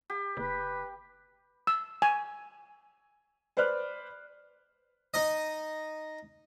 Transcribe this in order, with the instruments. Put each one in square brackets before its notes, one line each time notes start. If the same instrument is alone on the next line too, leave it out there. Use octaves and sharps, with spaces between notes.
[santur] G4
[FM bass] F#1 [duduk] B4
[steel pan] E6
G#5
[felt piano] B4 C5 D5 F6 F#6
[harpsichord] D#4 D#5